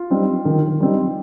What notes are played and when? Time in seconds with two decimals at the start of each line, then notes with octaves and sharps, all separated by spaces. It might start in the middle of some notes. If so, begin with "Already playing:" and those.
Already playing: F4
0.10 G3 C4 D#4
0.45 D#3
0.80 G3 C4 D#4